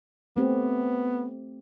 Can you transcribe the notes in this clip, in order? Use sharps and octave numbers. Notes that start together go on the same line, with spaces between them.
A3 B3 C4 G4